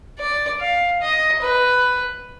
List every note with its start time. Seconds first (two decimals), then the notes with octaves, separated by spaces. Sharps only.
0.19 D5
0.61 F5
1.01 D#5
1.42 B4